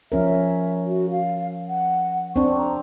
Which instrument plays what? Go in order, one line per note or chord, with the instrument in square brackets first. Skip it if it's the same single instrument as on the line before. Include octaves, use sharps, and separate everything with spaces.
[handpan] F3 C#4 A#4 [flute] E5
[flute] F#4
F5
F#5
[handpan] C4 D4 [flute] C#6
[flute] A#5